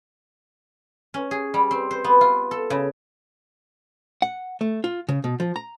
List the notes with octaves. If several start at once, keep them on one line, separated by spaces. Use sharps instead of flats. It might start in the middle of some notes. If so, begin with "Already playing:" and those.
C#4
G#4
G3
C4
C5
B3
F4
A4
C#3
F#5
A3
F4
C#3
B2
F3
A#5